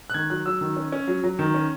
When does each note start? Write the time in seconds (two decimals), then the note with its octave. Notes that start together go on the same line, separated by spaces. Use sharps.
0.10 F#6
0.14 D#3 G#6
0.30 F#3 F#6
0.46 F#3 E6
0.61 D#3
0.76 C#4
0.92 C#4
1.08 F#3
1.24 F#3
1.39 D#3
1.54 C#4